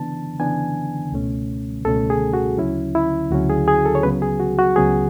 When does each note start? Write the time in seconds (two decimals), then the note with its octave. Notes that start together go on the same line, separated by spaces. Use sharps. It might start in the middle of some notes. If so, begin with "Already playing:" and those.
Already playing: C#3 E3 B3 D4 A5
0.40 C#3 E3 B3 D4 G#5
1.12 C#2 B2 A3 C#4
1.85 C#2 B2 A3 C#4 A4
2.10 G#4
2.33 F#4
2.58 D2 C#3 F#3 C#4 E4
2.95 E4
3.31 D2 C#3 F#3 C#4 F#4
3.50 G#4
3.68 G#4
3.86 A4
3.95 C#5
4.03 C#2 C#3 F#3 B3 B4
4.22 G#4
4.40 F#4
4.59 F#4
4.76 C#2 C#3 F#3 B3 G#4